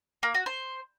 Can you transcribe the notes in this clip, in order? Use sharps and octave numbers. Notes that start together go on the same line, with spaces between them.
A#3
F#4
C5